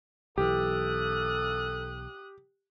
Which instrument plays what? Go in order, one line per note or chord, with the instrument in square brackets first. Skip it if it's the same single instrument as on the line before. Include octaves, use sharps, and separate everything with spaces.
[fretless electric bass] B1 E3 [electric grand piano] G4 [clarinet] A4 [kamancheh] D#6 F#6